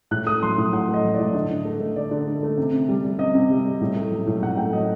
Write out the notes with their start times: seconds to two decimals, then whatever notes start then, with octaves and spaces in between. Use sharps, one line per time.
0.11 A2 F#6
0.26 A3 D#6
0.43 F#3 C6
0.58 A2
0.73 A2 F#5
0.89 A3
0.94 D#5
1.04 F#3
1.14 A2 D5
1.34 D3 D#5
1.50 D3
1.65 A3
1.80 A3
1.96 D3 D5
2.11 D3
2.27 A3
2.43 A3
2.57 C3
2.73 C3
2.89 G3
3.04 G3
3.19 C3 D#5
3.34 C3
3.50 G3
3.66 G3
3.81 A2
3.96 A3
4.11 F#3
4.27 A2
4.42 A2 F#5
4.57 A3 G5
4.73 F#3 D#5